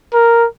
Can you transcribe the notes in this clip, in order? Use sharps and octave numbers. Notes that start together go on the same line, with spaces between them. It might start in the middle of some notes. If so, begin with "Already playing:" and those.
A#4